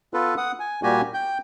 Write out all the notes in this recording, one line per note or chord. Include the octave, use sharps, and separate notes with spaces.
B3 F4 A4 B4
F#5 D#6
G#5
A#2 G3 A#3 F#4 G4 G#5
G5 G6